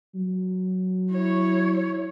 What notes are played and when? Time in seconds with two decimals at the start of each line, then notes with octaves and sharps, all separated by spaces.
0.15 F#3
1.12 E4 C#5